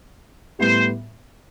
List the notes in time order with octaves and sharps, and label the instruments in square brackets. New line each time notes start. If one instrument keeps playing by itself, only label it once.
[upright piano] A2 G3 B3 [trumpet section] C5